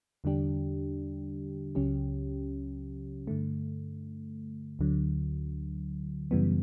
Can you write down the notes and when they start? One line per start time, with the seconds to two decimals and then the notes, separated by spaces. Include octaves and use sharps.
0.24 E2 D3 G3 D4 G4
1.75 C#2 C#3 F#3 C#4 G4
3.27 G2 D3 A3
4.79 D2 D3 F#3
6.31 F#2 C#3 E3 G3 B3